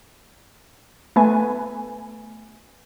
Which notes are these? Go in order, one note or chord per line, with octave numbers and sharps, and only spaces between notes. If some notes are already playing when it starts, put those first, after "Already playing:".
A3 B3 B4 G#5